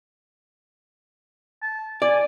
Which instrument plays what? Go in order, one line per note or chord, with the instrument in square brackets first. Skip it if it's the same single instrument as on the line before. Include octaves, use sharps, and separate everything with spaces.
[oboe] A5
[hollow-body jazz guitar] D5 [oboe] G#5